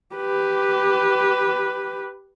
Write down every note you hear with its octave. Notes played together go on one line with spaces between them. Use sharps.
G4 B4